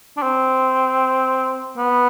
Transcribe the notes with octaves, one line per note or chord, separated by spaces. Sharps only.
D4
C4
B3